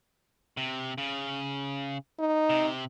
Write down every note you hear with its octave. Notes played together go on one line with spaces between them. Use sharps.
C3
C#3
D#4
C3